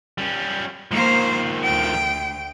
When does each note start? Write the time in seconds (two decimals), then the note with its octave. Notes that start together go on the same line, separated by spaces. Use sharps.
0.18 G3 C#4
0.91 D#3 F3 A#3 C5
1.64 D2 G5